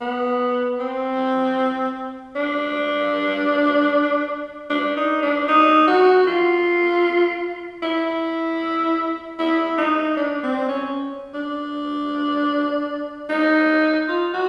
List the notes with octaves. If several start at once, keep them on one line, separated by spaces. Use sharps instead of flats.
B3
C4
D4
D4
D#4
D4
D#4
F#4
F4
E4
E4
D#4
D4
C4
C#4
D4
D#4
F4
F#4